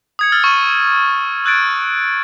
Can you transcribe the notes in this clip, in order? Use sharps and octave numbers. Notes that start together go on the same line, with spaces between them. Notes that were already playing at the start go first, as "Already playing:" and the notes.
D#6 G#6 C#7
E6 F6 A6
C#6 D#7
E6 F#6 G#6 A6 D7